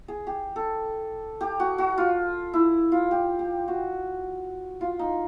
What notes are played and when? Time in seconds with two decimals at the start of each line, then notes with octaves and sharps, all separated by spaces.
0.08 G#4
0.27 G4
0.56 A4
1.41 G4
1.60 F#4
1.78 F#4
1.98 F4
2.53 E4
2.92 F4
3.11 G4
3.39 G4
3.68 F#4
4.81 F4
4.99 D#4